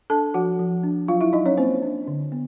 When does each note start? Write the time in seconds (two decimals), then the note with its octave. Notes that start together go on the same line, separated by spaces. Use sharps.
0.10 D4 A4 A5
0.34 F3 F#4 F#5
0.59 F3
0.83 D4
1.08 F#3 F4 F5
1.21 E4 E5
1.33 F#3 D#4 D#5
1.46 C#4 C#5
1.57 A#3 C4 C5
1.83 D4
2.07 D3
2.32 B3